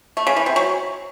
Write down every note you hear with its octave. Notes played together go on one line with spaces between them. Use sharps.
A3
C#3
E3
C3
F#3